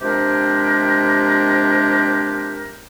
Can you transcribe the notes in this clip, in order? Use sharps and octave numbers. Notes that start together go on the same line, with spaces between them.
C3 F3 G#3 D4 G4 A#4